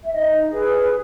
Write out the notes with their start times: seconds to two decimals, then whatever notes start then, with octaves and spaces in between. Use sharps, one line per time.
0.04 E5
0.13 D#4 D#5
0.51 G#4 B4